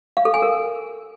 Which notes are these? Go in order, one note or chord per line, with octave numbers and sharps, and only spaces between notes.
F5
A4
G#5
A#4